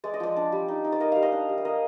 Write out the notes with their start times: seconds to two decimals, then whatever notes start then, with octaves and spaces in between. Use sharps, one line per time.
0.04 G#3 D5
0.14 D#5
0.20 F3 D5
0.36 D4
0.52 G3
0.68 D#4
0.84 D#4
0.92 D5
1.00 A#3 D#5
1.12 G3 F5
1.22 D#5
1.32 D4
1.49 G3
1.58 F5
1.65 A#3 D#5